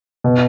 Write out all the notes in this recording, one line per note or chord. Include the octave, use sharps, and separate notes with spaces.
B2